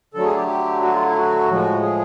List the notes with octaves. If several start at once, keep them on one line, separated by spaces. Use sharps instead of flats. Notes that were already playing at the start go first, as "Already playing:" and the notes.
D3 F#3 A3 A4
G#4
G4
G4
F#4
F4
E4
F#4
A2 F3 G#3
G#4